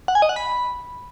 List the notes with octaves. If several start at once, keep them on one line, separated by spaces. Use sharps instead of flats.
F#5
G#5
D#5
F#5
B5